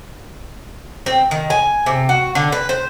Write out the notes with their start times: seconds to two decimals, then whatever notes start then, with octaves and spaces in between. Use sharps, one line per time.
1.06 C4
1.31 D#3
1.50 G#5
1.86 C3
2.09 F#4
2.35 D3
2.52 B4
2.69 C5